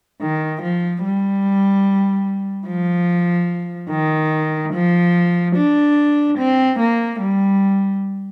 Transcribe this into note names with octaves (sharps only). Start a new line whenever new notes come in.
D#3
F3
G3
F3
D#3
F3
D4
C4
A#3
G3